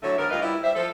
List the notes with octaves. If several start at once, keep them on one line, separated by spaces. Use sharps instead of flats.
A2 D3 F#3 A3 C#5 E5
G#2 D3 B3 A#4
D2 G2 F4 B4 D#5 F5
G3 B3 E4
G3 G4 C5 E5
F3 A4